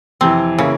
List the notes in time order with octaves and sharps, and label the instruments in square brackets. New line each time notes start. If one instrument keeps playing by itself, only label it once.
[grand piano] F2 C3 E3 [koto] C4
[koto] C#3 [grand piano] E3 A#3 E4